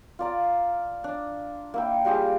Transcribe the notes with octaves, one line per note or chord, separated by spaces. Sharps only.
F4 D5 A#5
D4
A#3 E4 G5
G3 F4 G4 G#4